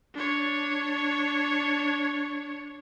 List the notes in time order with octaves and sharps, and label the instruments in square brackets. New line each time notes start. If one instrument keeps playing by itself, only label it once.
[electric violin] D4 C#5